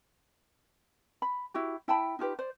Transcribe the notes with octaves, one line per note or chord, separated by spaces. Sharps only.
B5
E4 F#4 G4
E4 G5 A5 B5
D#4 F4 G4 B4
C5 D5